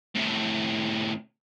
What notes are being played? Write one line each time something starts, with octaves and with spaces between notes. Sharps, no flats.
A2 C3